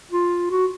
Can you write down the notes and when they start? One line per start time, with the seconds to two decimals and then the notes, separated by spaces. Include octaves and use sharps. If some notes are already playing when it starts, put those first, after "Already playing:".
0.11 F4
0.51 F#4